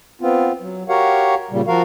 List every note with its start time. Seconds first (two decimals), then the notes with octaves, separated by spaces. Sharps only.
0.21 B3 C4 F4
0.61 F#3
0.89 F#4 G4 A#4 C#5 F5 F#5
1.51 A#2 C#3 G3
1.67 F3 F#4 A#4 F5